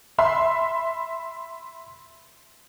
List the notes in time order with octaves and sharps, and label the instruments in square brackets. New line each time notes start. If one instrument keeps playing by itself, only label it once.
[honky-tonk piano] E5 B5 C6